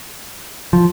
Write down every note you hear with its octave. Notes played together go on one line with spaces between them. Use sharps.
F3